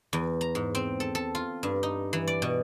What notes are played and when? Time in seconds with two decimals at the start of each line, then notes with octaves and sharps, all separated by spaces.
0.13 E2
0.41 A#5
0.55 G#2
0.75 C4
1.00 A4
1.15 A4
1.35 F4
1.63 G2
1.83 D#4
2.13 E3
2.28 D5
2.42 B2